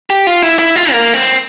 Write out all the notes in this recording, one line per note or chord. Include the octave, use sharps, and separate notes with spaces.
G4
F4
E4
E4
F4
A#3
C4